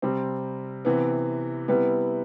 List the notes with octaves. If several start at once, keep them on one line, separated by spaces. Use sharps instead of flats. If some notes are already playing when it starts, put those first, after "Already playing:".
C3 G3 C4
C3 E3 B3
C3 G3 B3 E4 B4